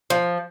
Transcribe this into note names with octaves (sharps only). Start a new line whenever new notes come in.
F3